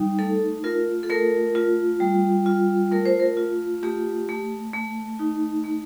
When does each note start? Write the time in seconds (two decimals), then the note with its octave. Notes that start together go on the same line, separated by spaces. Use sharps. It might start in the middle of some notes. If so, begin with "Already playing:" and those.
Already playing: G3 D#4
0.19 A3 A4
0.64 F4 A#4
1.03 A4
1.10 A3 A#4
1.55 F4
2.00 G3
2.46 F4
2.91 A3 A#4
3.05 C5
3.20 A#4
3.37 F4
3.83 A3 G4
4.29 A3
4.74 A3
5.19 D#4
5.64 A3